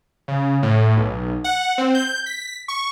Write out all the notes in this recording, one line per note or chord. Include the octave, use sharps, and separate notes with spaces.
C#3
A2
B1
F#5
C4
G6
B6
C#6